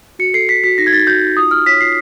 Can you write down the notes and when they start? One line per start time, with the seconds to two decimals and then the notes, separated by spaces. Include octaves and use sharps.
0.19 F#4 C#7
0.34 A4 C7
0.49 A4 B6
0.64 F#4 B6
0.78 D#4 A#6
0.87 G#6
0.93 D#4 A6
1.07 F#4 G6
1.22 D#4
1.37 F4 D#6
1.51 F4 F6
1.66 C#5 B6
1.81 F4 C7